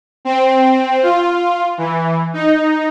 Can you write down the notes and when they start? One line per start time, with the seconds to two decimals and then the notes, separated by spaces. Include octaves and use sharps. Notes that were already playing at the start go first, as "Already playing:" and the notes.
0.25 C4
1.03 F4
1.78 E3
2.33 D#4